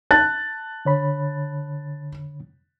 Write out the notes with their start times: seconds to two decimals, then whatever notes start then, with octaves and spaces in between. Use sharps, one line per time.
0.11 A5 F#6 A6
0.85 D3 C#5 B5